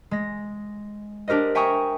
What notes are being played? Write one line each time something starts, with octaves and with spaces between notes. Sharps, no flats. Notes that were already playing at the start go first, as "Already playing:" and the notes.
G#3 A#6
D4 G4 A#4 C5 D#5
E5 G5 G#5 A#5 C#6 D#6